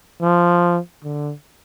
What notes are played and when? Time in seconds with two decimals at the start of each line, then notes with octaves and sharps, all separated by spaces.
0.21 F3
1.04 D3